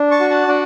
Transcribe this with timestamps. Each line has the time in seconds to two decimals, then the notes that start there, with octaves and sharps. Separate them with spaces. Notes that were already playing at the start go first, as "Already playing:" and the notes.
Already playing: D4
0.11 A5 C#6
0.20 F#4
0.30 F#5 A5
0.48 D4 D5 F#5